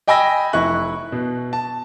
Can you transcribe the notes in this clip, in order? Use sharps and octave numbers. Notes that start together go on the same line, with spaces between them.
D#5 G5 G#5 B5 E6 A#6
F1 E4 C#6 F#6
B2
A5